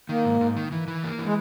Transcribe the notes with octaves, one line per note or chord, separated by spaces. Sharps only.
D#3 A#3
G#2
G#2
D#3
E3
E3
A#3
E3
G#3